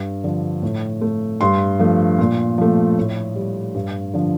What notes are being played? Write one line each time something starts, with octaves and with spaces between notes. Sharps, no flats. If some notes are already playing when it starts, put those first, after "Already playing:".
Already playing: G2
D3 F3
A2
A3
G2 C6
F3 A3
A#2
F3 A3
A2
G3
G2
D3 F3